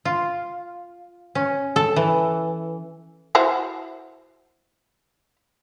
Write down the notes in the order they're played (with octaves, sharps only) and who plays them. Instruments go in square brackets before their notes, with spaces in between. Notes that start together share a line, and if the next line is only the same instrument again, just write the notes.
[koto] F4
C#4
A4
E3
[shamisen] E4 F#4 C5